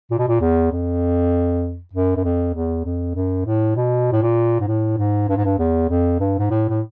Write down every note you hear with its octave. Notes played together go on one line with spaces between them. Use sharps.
A#2
B2
A#2
E2
F2
F#2
F#2
F2
E2
F2
F#2
A2
B2
A2
A#2
G#2
A2
G#2
G2
G#2
G2
E2
F2
G2
G#2
A2
A2